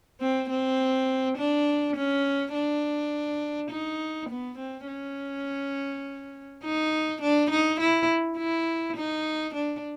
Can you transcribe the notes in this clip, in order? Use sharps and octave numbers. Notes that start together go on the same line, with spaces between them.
C4
C4
D4
C#4
D4
D#4
B3
C4
C#4
D#4
D4
D#4
E4
E4
D#4
D4